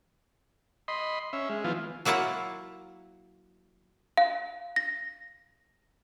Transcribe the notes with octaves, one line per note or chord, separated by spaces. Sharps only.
D#5 B5 C6
C#4 E5
G#3
E3 F3 B3 F4
F#3 A#3 E4 F4 F#5
F5
A#6